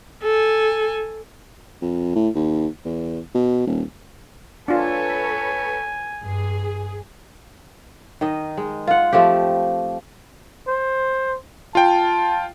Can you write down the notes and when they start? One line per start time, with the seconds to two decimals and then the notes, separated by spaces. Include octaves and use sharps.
0.22 A4 G#5
1.81 F2
2.15 A2
2.35 D#2
2.85 E2
3.35 B2
3.67 D#1
4.68 D4 F4 A4 B4 C#5 G#5
6.23 G2 G#4
8.21 D#3 D#5
8.57 G#3
8.87 F4 F#5
9.13 F3 A3 C4 G4
10.68 C5
11.75 F4 G5 A5